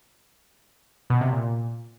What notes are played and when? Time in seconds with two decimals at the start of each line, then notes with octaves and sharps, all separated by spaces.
1.10 B2
1.21 C3
1.32 A#2